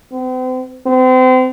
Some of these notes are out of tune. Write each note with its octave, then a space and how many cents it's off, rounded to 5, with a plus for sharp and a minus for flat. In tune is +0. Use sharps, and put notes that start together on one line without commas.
C4 -40
C4 -35